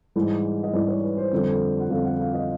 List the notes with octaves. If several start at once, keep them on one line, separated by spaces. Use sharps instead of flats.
G#2 E3 G3
D#5
G#2 E3 G3 D5
C#5
B4
C5
F2 D3 G3
F#5
F2 D3 G3 F5
F#5
F5
D#5